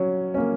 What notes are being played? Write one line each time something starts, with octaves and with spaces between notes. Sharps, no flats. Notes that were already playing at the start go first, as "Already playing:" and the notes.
Already playing: F#3 C#4
A#3 C#4